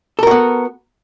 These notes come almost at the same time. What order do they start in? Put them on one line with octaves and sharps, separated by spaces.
A4 A#4 F#4 B3